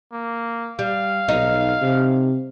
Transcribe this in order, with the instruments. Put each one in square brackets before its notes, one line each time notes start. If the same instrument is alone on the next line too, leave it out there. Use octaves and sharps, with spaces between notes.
[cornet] A#3
[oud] G3 [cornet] F5
[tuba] B1 [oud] D#4
[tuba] C3